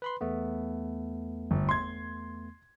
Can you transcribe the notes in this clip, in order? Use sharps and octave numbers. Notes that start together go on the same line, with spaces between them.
B4 B5 C6
E2 A3 B3
G1
C6 G#6